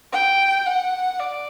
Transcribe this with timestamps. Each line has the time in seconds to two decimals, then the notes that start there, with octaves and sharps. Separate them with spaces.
0.12 G5
0.66 F#5
1.20 D5